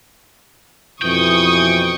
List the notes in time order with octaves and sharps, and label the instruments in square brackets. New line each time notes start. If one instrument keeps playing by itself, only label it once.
[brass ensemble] F2 B2 E3 [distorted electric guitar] G5 [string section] C#6 D#6